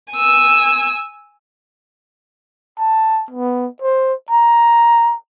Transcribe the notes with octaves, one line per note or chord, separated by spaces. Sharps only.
G#5 E6
A5
B3
C5
A#5